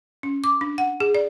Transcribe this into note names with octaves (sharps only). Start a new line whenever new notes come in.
C#4
D6
D4
F#5
G#4
D5